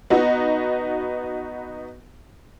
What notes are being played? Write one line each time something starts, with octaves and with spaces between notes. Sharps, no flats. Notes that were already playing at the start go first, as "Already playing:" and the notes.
B3 D#4 F#4